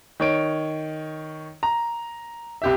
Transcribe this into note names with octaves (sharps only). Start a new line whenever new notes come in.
D#3 C#5 D7
A#5
C2 G4 E5